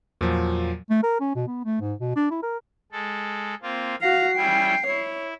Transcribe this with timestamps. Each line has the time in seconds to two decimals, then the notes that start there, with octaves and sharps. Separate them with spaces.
0.21 E2 A#2 F3 F#3
0.90 A3
1.03 A#4
1.20 C#4
1.35 B2
1.47 B3
1.65 A3
1.81 G#2
2.00 B2
2.16 D4
2.31 E4
2.43 A#4
2.92 G#3 A4
3.62 A#3 C4 F4
4.01 F#4 F5 A#5 C7
4.37 G3 C#4 E4 G5
4.87 E4 C#5